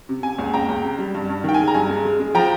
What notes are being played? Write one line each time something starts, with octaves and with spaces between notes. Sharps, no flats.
C3
C3 G#5
C#2
C#2 G5 A#5
C#2
C3
G3
G2
G2
D#3 G5
G#5
G#3
A#5
G2 G#5
G#3
G#3
G#3
F3 G5 A#5